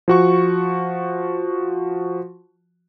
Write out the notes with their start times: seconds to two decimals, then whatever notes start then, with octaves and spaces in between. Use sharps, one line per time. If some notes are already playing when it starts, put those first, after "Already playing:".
0.08 F3 F#4 C#6